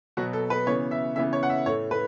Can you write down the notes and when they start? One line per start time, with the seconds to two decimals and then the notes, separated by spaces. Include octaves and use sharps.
0.17 B2 F#3 B3 F#4
0.33 A4
0.50 B4
0.66 C#3 E3 B3 C#5
0.91 E5
1.16 C#3 E3 B3 E5
1.33 C#5
1.43 F#5
1.50 E5
1.66 A2 A3 C#5
1.91 B4